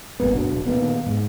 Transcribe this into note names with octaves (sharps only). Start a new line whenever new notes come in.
G#1 G2 A#3 B3
D1 G1 B2 D4
A#2 D#3 A#3 B3
G#2